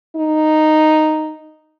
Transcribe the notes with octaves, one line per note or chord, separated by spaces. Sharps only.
D#4